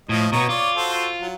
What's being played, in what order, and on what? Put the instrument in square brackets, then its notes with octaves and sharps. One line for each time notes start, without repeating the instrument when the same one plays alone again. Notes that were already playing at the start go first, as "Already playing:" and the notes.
[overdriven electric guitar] A2 [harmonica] F3 D#5
[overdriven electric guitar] B2 B3 [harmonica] C#5 D#5 A#5
[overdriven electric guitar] F4 [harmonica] C#5 D5
[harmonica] F#4 A4 C5
F#3